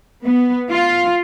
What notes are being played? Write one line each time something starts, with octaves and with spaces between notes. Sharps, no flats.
B3
F4